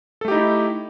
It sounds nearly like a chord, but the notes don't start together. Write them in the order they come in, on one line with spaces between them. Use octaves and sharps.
A4 A3 G4 D#4 E4